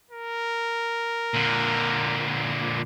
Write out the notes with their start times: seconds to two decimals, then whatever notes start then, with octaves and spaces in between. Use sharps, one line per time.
0.11 A#4
1.34 A#2 D3